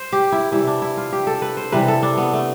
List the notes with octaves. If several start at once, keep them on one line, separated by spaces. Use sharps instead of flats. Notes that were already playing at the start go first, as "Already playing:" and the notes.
Already playing: C5
G4
E4
C3 E3 G3 E4
D4
E4
F4
G4
A4
B4
C5
C3 E3 G3 B4
A4
D4
B3
A3